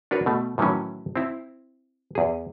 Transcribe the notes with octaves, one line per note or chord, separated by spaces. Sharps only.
D4 F#4 A#4 B4 C#5
B2 A3
A2 D#3 E3 F#3 C#4
C4 E4
E2 G#4